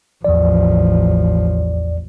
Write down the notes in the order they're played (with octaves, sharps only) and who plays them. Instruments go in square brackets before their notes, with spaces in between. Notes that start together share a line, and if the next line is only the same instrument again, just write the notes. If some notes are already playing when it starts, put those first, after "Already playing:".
[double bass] A1 F3 [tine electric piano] E2 D5